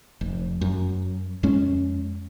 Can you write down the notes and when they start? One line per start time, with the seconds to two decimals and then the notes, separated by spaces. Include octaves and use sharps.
0.21 F1
0.61 F#2
1.43 F2 G#3 C#4